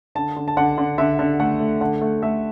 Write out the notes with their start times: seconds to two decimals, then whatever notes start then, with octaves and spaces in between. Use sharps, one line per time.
0.15 D3 A5
0.36 D3
0.48 A5
0.57 D3 F#5
0.78 D3
0.98 D3 E5
1.19 D3
1.40 A3 F#5
1.60 A3
1.81 D3 F#5
2.01 A3
2.23 A3 E5